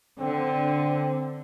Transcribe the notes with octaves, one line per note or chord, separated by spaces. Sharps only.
D3 C4